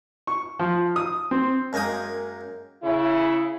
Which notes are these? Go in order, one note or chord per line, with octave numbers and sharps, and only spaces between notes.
C#6
F3
D#6
C4
F#2 G#3 A#3 G5 D#6
C#3 E4